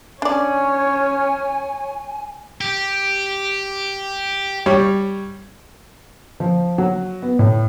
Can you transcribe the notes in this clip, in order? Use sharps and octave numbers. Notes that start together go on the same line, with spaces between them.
C#4 D4 C#5 D5 G#5
G4
G3 C#5
F3
F#3
B3
A2